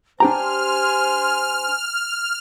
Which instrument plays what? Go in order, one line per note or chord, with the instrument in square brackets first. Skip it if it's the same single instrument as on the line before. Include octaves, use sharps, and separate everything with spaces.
[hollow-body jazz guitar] D4 G4 A#5 [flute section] C5 G#5 C6 [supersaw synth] F6